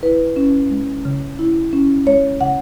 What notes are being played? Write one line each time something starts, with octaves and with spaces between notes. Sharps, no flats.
E4 B4
C#4
G#3
C#3
E4
C#4
G#3 C#5
C#3 F#5